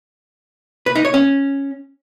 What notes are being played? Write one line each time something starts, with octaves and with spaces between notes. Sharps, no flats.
B4
D#4
C#5
C#4